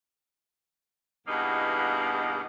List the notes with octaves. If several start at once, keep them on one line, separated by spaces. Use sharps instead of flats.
E2 G2 B2 A#3 D#4